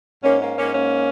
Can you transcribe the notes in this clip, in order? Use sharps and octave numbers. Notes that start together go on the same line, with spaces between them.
G#2 A#3 C#4
A#3 C#4
G#2 A#3 C#4
A#3 C#4